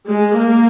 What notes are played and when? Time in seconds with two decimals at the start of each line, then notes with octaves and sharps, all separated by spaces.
0.08 G#3
0.37 A#3